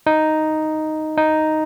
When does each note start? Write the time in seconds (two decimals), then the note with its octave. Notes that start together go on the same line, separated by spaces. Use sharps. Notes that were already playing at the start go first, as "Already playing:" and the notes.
0.07 D#4
1.17 D#4